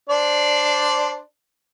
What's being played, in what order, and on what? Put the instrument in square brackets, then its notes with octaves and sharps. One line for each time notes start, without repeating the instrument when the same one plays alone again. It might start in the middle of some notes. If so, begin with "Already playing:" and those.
[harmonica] D4 C5 D5